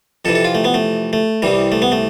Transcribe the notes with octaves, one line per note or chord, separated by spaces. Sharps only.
F2 C3 E3 A4
A4
F4
A3
B3
A3
A3
C2 C3 E3 G3
A3
B3
A3